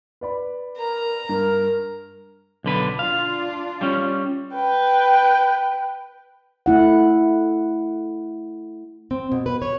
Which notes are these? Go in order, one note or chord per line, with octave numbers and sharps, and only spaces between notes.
B4 D5 B5
A#4 A#5
G2 A#4
B1 D3 B4
D4 F4 F5
G3 C#4
B4 G5
A3 E4 F#5
C4
B2
B4
C#5